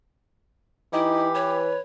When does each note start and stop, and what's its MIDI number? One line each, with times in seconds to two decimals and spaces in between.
0.93 1.75 52
0.93 1.27 63
0.93 1.28 64
0.93 1.61 67
1.35 1.79 71
1.35 1.80 73